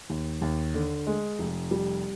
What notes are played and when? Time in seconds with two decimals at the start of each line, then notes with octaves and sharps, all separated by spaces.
0.10 D#2
0.42 D#2
0.74 D3
1.07 G#3
1.39 F1
1.71 G3